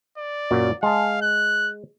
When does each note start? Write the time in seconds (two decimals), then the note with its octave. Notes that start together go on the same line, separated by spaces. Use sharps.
0.18 D5
0.51 F#2 A#2 F#3
0.83 G#3 F5 A5
1.22 F#6